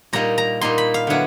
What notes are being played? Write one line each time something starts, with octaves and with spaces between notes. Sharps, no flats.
A#2 G3 A#3 D#4 A#5
A#5
A#2 G3 A#3 D#4 C6
B5
F5
D3 F#3 B3 E4